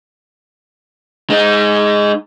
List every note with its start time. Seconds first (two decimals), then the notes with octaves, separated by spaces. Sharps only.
1.30 G#3 D#4